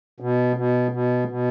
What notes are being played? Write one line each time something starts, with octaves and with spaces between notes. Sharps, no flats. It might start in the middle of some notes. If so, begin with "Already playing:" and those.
B2
B2
B2
B2